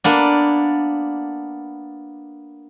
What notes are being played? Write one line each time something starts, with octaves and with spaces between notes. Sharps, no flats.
A#3 B3 D4